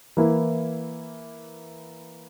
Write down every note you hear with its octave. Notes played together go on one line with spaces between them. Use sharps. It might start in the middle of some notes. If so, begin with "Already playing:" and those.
E3 A#3 E4